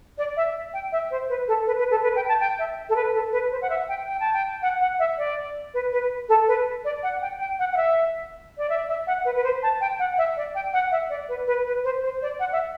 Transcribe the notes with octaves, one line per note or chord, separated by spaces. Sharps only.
D5
E5
G5
E5
C5
B4
A4
B4
B4
A4
B4
G5
A5
G5
E5
A4
B4
A4
B4
C5
F#5
E5
G5
G5
A5
G5
F#5
F#5
E5
D5
B4
B4
A4
B4
D5
F#5
G5
G5
F#5
F#5
E5
D5
E5
E5
F#5
B4
B4
C5
A5
G5
F#5
E5
D5
G5
F#5
E5
D5
B4
B4
B4
C5
C5
D5
F#5
E5